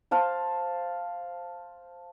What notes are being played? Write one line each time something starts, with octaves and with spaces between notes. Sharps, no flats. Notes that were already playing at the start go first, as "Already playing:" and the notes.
C5 F5 A5